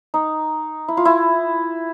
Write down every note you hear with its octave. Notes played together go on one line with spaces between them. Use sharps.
D#4
E4
F4
E4